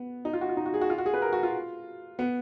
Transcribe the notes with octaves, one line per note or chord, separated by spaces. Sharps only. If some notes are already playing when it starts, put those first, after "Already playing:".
Already playing: B3
D#4
F4
F#4
F4
D#4
F#4
G#4
F#4
F4
F#4
G#4
B4
A#4
F#4
F4
B3